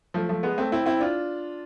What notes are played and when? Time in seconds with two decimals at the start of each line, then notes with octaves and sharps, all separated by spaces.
0.14 F3 A3
0.29 F3 A3
0.43 G#3 B3
0.58 A3 C4
0.72 C4 E4
0.86 C4 E4
1.00 D4 F4